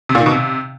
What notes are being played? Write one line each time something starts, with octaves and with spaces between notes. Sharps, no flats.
C3
A#2
D#3
B2
C3